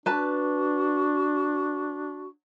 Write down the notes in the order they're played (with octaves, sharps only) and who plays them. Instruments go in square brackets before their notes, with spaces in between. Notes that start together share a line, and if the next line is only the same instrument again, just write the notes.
[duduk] D4 [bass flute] F#4 [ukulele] B4 A5